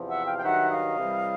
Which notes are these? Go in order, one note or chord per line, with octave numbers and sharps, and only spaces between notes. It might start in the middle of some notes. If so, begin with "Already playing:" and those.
Already playing: E2 C3 F3
E5 F#5
F5 G5
G5
G2 D#3 F#3 E5 F#5
D#5 F5
C2 C3 E3 G3